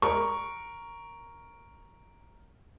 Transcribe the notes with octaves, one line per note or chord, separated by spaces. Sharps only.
A#4 C#6